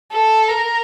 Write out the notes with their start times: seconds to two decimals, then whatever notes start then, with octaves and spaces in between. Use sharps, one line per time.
0.13 A4
0.49 A#4